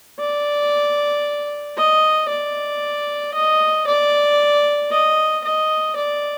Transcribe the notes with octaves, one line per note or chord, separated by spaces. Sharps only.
D5
D#5
D5
D#5
D5
D#5
D#5
D5